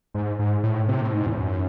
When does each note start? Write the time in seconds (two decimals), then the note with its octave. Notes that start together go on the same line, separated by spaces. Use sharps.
0.14 G#2
0.39 G#2
0.63 A2
0.88 C3
1.01 A2
1.12 G#2
1.26 E2
1.38 F#2